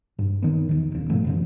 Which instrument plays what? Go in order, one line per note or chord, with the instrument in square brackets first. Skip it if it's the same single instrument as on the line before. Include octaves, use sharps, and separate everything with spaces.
[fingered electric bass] G2
D#3 B3
E2 D#3
D#1 C#3
G#2 B2 F3 A3
F#2 C#3 E3